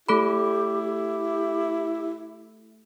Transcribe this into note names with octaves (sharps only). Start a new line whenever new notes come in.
A3 E4 G4 A4 B5
G4